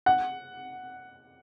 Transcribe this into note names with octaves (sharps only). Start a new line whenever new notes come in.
F#5